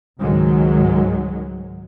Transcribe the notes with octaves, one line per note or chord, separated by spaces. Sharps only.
C#2 G#2 D#3 F#3 G#3